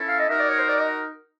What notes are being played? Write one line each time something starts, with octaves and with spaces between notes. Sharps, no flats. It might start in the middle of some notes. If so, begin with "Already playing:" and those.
Already playing: C#4 E4 A4
F5
D#5
D#4 F#4 A#4 E5
D5
C#5
C5
D5
D#5